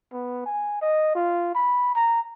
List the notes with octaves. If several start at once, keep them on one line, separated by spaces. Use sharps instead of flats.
B3
G#5
D#5
F4
B5
A#5